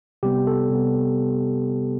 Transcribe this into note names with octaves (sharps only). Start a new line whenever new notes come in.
C3 G3 B3 G4
A4
C3 G3 B3